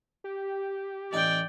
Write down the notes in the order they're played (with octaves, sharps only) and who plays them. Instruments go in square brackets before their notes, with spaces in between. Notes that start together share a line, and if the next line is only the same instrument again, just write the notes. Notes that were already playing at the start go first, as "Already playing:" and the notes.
[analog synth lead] G4
[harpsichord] A1 D#4 [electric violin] D5 G5